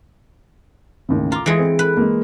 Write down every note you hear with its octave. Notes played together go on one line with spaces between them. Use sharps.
A1 D#2 C#3
F4 A#5 D6
E3 G#3 D#6 C#7 D7
C4
B4
G#3 A#3